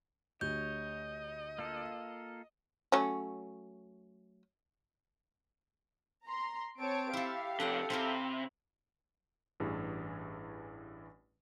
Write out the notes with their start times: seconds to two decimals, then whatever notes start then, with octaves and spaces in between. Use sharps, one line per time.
0.41 D2 G4 C#5 D#5 G6
1.59 A#3 F4 A4
2.92 F#3 A3 C#4
6.25 A#5 C6
6.78 C4 C#5 A5 D7
7.13 E4 G4 A4 F5
7.60 F2 C3 A4 F#5 G5 C6
7.90 C3 C4 E4 A#4
9.60 A1 G2 E3 G#4